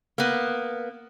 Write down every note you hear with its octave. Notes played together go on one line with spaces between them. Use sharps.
A#3 B3